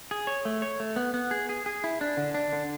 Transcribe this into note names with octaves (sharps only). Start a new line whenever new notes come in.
G#4
C#5
A3
C#5
A3
B3
B3
G#4
G#4
G#4
E4
D4
D3
D4
D3